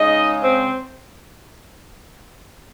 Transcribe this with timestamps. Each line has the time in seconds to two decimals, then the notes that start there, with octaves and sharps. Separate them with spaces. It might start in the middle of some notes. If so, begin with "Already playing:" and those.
Already playing: C#3 G#3 D#4 D#5
0.43 C4 C5